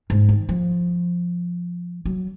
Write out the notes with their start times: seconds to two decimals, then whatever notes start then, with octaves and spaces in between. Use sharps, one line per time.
0.10 G#2
0.29 D#3
0.49 F3
2.05 F#3